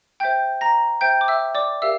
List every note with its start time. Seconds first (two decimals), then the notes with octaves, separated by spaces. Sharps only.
0.20 C5 E5 G5 G6
0.61 A#5 A#6
1.01 C5 E5 G5 G6
1.21 D6
1.28 E5 E6
1.55 D5 D6
1.82 G4 A#4 E5 F5 E6